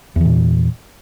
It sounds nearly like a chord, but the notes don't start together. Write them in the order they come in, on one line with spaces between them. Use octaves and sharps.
E2 E3 A#2